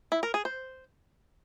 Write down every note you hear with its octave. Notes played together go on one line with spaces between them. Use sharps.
E4
A#4
G#4
C5